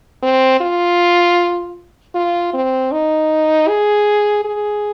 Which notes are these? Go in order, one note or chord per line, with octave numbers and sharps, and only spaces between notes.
C4
F4
F4
C4
D#4
G#4
G#4